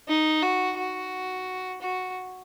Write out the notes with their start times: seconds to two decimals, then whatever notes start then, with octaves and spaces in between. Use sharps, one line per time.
0.08 D#4
0.43 F#4
0.78 F#4
1.82 F#4